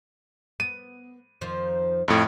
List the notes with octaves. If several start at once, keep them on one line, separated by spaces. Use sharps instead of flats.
B3 D#7
F2 D#3 F3
F2 A2